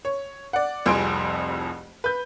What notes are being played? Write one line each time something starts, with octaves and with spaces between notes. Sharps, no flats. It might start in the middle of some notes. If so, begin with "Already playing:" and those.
C#5
D5 F#5
F1 C2 F2 G#4 C6 D7
B4 G6